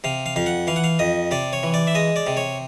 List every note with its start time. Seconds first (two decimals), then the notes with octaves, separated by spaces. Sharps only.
0.04 C3 F5
0.26 F5
0.36 F2 F5
0.46 F#5
0.67 E3 F5
0.76 F#5
0.84 F5
0.99 F2 D#5
1.31 C3 D5
1.53 C#5
1.63 E3
1.74 D5
1.87 E5
1.95 G#3 D#5
2.16 D5
2.27 C3
2.37 C#5